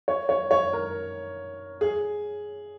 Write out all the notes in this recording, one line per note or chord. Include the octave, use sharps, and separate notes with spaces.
C#5
C#5
C#5
A#4
G#4